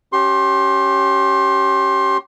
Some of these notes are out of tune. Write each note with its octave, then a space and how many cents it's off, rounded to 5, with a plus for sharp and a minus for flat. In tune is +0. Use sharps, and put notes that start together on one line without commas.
C#4 +0 G4 -25 C6 +25